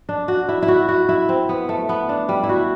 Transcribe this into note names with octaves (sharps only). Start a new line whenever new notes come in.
D4
F#4
E4
E4
F#4
F#4
E4
C4
B3
A3
B3
D4
G3
E4
F#4